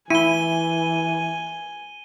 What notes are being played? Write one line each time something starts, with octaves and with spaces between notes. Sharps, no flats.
E3 E4 G#5 D#7 G7